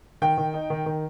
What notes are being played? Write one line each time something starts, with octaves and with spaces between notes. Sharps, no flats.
D#3 G5
D#3
D#4
D#3
D#3